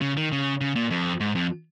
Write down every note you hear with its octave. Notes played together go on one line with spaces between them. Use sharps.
C#3
D#3
C#3
C#3
A#2
F2
G#2
F2